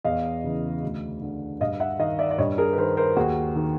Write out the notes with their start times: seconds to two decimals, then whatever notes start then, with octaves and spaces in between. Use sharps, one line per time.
0.04 E2 D#5 F5
0.44 C#3 E3
0.83 D2
1.22 D3
1.61 G2 D#5 F5
1.80 E5 F#5
1.99 D#3 D#5 F5
2.19 D5 E5
2.31 D5
2.38 G2 C#5 D#5
2.58 G#4 A#4
2.73 B4
2.77 D#3 A#4 C5
2.97 A#4 C5
3.17 D#2 F#4 G#4
3.56 D#3